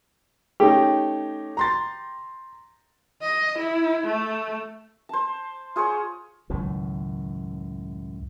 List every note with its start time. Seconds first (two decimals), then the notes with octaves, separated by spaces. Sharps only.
0.60 A3 C#4 D#4 G4
1.57 A#5 C6 A6
3.22 D#5
3.59 E4
4.06 A3
5.09 C5 A5
5.76 F4 G#4 C5 C#5
6.50 C#2 F#2 A2 D#3